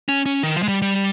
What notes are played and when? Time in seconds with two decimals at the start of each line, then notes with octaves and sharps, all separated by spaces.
0.09 C#4
0.26 C#4
0.43 D#3
0.56 F3
0.63 G#3
0.68 G3
0.82 G3